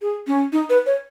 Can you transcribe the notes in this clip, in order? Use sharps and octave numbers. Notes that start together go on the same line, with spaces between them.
G#4
C#4
D#4
B4
C#5